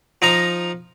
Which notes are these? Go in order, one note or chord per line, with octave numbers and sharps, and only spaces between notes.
F3 D#4 D#5 A#5